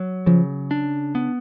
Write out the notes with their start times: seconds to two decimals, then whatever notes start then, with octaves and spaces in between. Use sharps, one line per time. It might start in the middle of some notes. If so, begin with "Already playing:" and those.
Already playing: F#3
0.26 C#3 F3
0.71 D4
1.15 B3